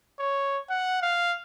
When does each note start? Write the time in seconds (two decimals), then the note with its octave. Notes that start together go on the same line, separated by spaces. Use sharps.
0.19 C#5
0.70 F#5
1.02 F5